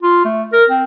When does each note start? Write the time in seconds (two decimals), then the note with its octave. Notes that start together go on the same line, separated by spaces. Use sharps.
0.03 F4
0.25 A3
0.53 A#4
0.70 C4